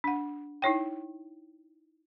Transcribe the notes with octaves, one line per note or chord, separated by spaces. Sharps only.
D4 F#5
D#4 E4 C#5 G5